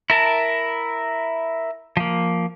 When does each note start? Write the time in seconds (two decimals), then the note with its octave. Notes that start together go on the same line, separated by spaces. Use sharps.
0.10 E4 A#4 A5
1.97 F3 A#3